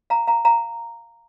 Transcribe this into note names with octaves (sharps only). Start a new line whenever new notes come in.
F5 A#5
F5 A#5
F5 A#5